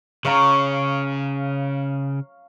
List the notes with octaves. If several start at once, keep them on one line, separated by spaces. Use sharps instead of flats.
C#3 C#5 F5 A#5